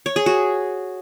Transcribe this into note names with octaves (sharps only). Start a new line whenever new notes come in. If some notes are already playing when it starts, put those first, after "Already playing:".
C#5
G#4
F#4